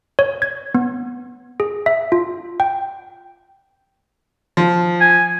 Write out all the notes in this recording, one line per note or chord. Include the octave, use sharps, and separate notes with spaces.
C#5
G#6
B3
G#4
E5
F4
G5
F3
G#5